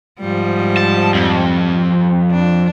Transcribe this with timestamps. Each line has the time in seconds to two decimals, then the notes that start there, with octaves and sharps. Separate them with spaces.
0.20 G#2 F3 G3
0.77 A5
1.15 F2
2.31 D4